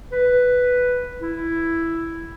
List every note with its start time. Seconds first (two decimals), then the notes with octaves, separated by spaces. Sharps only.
0.12 B4
1.21 E4